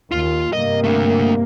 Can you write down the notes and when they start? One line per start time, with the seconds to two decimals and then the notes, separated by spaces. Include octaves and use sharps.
0.12 D#2 F4
0.53 G2 C3 A#3 D#5
0.84 A3 D4